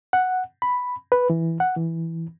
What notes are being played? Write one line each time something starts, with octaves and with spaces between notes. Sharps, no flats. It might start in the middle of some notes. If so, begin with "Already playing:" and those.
F#5
B5
B4
E3
F#5
E3